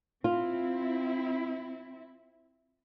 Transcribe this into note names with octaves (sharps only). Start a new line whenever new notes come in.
C4 E4 F4